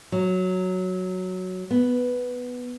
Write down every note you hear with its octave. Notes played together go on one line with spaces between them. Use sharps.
F#3
B3